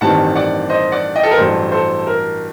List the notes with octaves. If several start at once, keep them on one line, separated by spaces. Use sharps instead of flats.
A1 G2 D#3 G3 C4 F#5 A5
D5 F#5
C5 D#5
D5 F#5
D#5 G5
A4
A#4
A1 G2 F#3 A4 C5
A4 C5
A#4